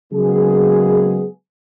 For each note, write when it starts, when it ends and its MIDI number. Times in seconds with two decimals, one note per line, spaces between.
0.12 1.26 49
0.12 1.26 54
0.12 1.26 56
0.12 1.26 58
0.12 1.26 59
0.12 1.26 68